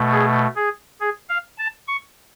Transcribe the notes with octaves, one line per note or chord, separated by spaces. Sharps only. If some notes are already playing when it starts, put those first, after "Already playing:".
Already playing: B2 A3
G#4
G#4
G#4
F5
A5
C#6